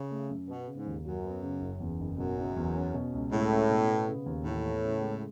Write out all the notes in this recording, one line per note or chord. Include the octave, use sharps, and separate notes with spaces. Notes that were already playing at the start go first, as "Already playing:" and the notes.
Already playing: C#3
A3
F#2
B2 B3
C#3
G#2
D#2
F#2 F#3
B3
C#3
F#1
E2
F#1
F#2 B2
F#1
E2
C#4
B2
C#2
A2 G#3
C#4
B2
B3
C#3
D#2
A2 E3
B3
C#3
G#3